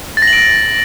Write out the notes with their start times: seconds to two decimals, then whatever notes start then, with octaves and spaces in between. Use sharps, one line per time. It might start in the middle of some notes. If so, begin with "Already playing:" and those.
0.17 A6
0.22 A#6
0.27 F#7
0.33 D7
0.38 A#6